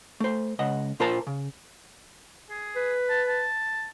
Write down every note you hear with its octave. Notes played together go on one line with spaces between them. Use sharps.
A3 C5
C#2 D#5 F#5
A#2 F4 A#4 C5 A5 A#5
C#3
G#4
B4
A5
A5